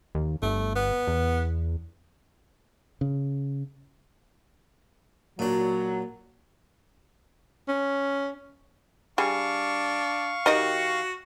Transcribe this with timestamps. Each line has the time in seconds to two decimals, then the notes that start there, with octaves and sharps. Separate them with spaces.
0.15 D#2
0.42 G1 A3
0.75 B3
1.08 E2
3.01 C#3
5.39 A#2 F#3 D4
7.68 C#4
9.18 G3 D4 G#4 F5 C#6
10.46 D#3 F#4 G4 D#5